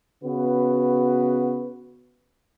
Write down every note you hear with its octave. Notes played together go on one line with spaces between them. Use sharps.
C#3 B3 F#4 B4